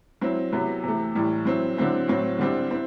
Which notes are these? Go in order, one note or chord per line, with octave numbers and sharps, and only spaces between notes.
F#3 C4 E4
C3 F#3 B3 E4
C3 E3 A3
A2 E3 G3
F#3 C4 E4
D3 F#3 C4 E4
A2 F#3 C4 E4
D3 G3 C4 E4
C4 E4